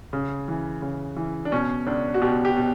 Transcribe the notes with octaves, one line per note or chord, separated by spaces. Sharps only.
C#3
E3
C#3
E3
D4
B2 C#4
C#2 D4
F#4
B2 G4
G4
B2